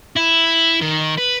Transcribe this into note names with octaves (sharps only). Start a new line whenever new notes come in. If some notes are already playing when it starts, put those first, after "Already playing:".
E4
D#3
B4